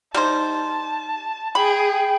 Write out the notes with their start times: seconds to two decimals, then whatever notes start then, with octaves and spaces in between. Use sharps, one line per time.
0.14 G3 D#4 C5 A5
1.55 G#4 G5 B5